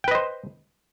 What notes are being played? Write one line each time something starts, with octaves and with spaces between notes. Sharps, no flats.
B4 C5 D#5 G5